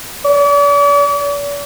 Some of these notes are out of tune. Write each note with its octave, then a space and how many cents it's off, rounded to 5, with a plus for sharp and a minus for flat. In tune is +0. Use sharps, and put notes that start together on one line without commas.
D5 -45